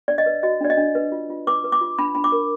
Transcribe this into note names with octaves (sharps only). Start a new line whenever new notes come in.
D4 D5
D#5
B4
F#4 D#5
D4 D5
D#5
D4
B4
F4
F4
B4 D6
B4
D6
F4
D4 B5
D4 B5
D6
A#4